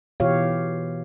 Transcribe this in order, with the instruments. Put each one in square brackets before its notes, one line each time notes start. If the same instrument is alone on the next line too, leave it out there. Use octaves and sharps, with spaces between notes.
[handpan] B2 E3 F4 G4 C#5 F5